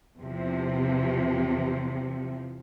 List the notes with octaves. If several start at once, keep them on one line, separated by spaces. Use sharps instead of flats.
E2 C3 F3